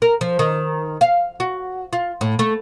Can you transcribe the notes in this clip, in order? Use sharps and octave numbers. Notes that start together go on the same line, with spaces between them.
A#4
F3
D#3
F5
F#4
F4
A2
A3